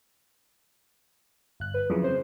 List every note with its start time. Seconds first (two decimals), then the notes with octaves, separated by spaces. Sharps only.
1.60 G1 F#6
1.74 B4
1.90 F2 C#3 E3 F#3
2.04 C5